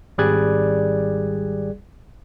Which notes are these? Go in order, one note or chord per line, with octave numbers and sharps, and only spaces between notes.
G#1 G3 G#4 D5 F#6 G#6